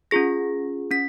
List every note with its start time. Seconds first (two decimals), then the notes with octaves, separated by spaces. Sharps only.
0.11 C#4 F4 G#4 A#6
0.91 C#4 B6